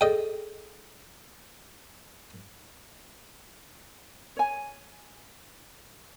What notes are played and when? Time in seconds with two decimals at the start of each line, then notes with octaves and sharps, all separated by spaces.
0.01 G#4 A4 D#5 G5
4.37 C#5 G#5